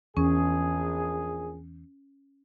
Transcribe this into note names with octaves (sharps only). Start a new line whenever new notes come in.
A#1 E2 C#4 G#4